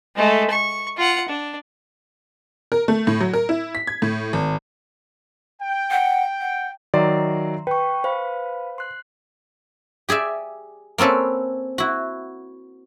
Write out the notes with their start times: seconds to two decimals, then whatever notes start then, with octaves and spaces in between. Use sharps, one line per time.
0.15 G#3 A3
0.50 C#6
0.97 F4 F#5
1.28 D4
2.72 A#4
2.88 A3
3.07 A2
3.21 F#3
3.33 A#4
3.49 E4
3.75 B6
3.87 G#6
4.02 A2
4.33 G#1
5.62 G5
5.91 F#5
6.41 F#5
6.94 D#3 F#3 D5 E5 A#5 C6
7.67 B4 G5 C#6
8.04 C5 F5 B5
8.78 C6 F#6
10.09 G4 G#4 D5 E5
10.98 A#3 C4 C#4 A4 B4
11.78 E4 F#4